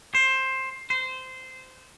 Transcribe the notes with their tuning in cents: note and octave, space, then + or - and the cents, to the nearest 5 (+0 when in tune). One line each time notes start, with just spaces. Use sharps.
C5 +15
C5 -15